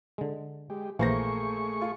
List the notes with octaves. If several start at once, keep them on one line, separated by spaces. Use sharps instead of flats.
D3 G#3
G#3 G4
A#1 E3 A3 A#3 G#4 C5 C#6 A#6
F4